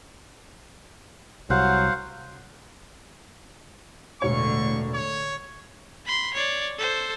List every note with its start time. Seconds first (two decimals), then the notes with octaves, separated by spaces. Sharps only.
1.50 C2 F#3 C5 F5 F#5
4.22 E1 A2 D3 C#5 C#6
4.94 C#5
6.06 B5 C6
6.34 C#5 D5
6.78 A4 C5